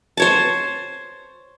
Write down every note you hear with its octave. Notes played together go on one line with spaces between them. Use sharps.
C5 C#5 A5